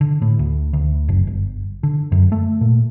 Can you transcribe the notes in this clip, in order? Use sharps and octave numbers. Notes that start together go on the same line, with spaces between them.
D3
A2
D2
D2
F#1
G1
D3
F#2
A3
A#2